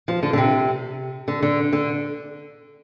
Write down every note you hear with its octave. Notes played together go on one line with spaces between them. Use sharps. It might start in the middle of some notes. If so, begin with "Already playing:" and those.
F3
D3
D3
C3
D3
D3
D3